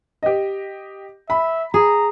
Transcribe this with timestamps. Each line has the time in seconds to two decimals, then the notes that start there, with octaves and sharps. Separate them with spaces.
0.23 G4 D#5
1.30 E5 B5
1.74 G#4 A#5